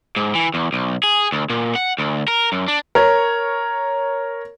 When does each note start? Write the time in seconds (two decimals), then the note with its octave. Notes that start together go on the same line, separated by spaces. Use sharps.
0.16 G#2
0.35 E3
0.54 E2
0.73 B1
1.03 G#4
1.32 D2
1.50 A#2
1.75 F#5
1.98 D2
2.28 A#4
2.52 F#2
2.68 D4
2.95 A#4 C#5